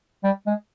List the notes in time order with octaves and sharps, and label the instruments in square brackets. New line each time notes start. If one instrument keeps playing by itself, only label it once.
[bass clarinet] G3
G#3